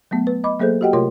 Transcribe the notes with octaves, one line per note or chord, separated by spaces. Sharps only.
F#3 A3 B3
B4
D#5 B5 D6
F#3 A#3 G#4 A4 C5 G6
F#4 G4 D#5 F#5 G5
C3 A3 F4 A#4 C#5 C6